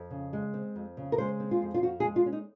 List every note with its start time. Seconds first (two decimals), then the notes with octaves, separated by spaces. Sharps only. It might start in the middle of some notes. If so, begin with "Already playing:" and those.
Already playing: F2
0.11 C#3
0.33 G#3
0.54 C4
0.76 F2
0.97 C#3
1.12 A#4
1.18 G#3 C5
1.40 C4
1.51 F4
1.62 F2
1.74 F4
1.83 F3 F#4
2.00 G#4
2.04 G#3
2.16 F4
2.26 C#4
2.33 D#4